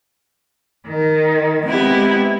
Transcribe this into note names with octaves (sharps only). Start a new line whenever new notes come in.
D#3
G#3 B3 C4 E4 G4